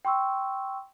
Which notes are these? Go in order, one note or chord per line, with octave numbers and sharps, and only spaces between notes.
G5 C6 C#6 E6